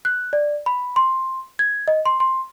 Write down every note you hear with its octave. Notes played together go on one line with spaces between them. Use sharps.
F#6
D5
B5
C6
G#6
D#5
C6
C6